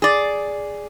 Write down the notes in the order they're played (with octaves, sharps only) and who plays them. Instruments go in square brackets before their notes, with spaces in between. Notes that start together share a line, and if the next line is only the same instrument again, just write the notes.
[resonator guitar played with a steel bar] G#4 D5